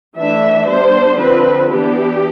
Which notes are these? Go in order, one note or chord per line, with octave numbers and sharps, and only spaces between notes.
E3 A3 D4 E5
G3 B3 D4 C5
D3 F3 C4 B4
E3 B3 D4 G4